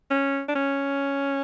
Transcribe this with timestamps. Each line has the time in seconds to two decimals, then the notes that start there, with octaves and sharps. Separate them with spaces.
0.10 C#4
0.48 D4
0.55 C#4